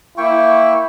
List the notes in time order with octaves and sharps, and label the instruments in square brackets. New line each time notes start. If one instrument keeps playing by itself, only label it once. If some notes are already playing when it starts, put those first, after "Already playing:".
[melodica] A#3 G5 C#6 [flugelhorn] E4